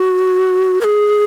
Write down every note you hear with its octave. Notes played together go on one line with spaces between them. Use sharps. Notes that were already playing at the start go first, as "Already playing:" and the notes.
Already playing: F#4
A#4
G#4